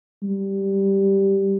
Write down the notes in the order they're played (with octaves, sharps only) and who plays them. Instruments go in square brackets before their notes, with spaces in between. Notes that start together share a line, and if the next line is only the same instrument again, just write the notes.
[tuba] G3